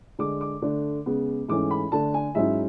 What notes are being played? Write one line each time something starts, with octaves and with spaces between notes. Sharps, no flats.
D3 G#3 D4 D6
D6
D3 A3 D4
C#3 G#3 B3
G#2 E3 A3 C#4 D6
B5
D3 A3 D4 A5
G#5
G#2 F#3 C#4 E4 E5